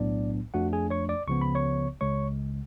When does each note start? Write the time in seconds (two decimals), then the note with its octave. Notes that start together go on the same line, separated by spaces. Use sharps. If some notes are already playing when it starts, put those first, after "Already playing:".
Already playing: B1 A2 F#3 B3 D4 D5
0.54 F2 F3 A3 D4 F#4 F#5
0.73 G#4 G#5
0.90 C#5 C#6
1.09 D5 D6
1.27 C#2 C#3 F3 B3 C#6
1.41 B5
1.55 C#5 C#6
2.01 C#2 C#3 G#3 C#5 C#6